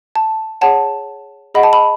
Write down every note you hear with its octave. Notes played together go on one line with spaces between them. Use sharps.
A5
G#4 C#5 F#5 A5
G#4 D#5 F#5 B5
A5
B5